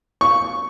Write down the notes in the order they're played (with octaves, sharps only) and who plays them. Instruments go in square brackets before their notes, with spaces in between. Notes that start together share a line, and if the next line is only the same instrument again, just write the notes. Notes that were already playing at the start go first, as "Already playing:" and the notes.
[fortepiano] C#6